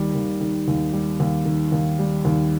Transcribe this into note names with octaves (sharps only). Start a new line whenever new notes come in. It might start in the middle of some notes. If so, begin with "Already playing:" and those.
Already playing: D#2 D#3 G3
D#2
D#3
D#2
G3
D#2
D#3
D#2
G3
D#2